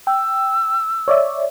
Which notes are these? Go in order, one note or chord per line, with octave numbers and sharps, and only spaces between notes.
G5 E6
C#5 D5 E5